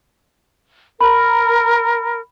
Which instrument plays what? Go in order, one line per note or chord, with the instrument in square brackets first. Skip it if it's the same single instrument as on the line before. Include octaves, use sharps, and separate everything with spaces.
[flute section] A#4 [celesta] B5